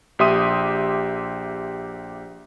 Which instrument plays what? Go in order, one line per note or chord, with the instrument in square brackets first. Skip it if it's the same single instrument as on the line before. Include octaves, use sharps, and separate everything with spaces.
[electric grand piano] A#1 G4 E5 C6 D#6 D#7